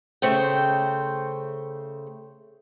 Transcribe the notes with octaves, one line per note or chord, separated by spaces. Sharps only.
C#3 A3 C5 G5